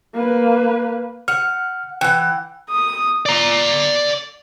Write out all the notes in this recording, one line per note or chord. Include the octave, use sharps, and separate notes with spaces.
A#3 B4
F#5 F6
E3 F#5 G5
D#6
D5 A#5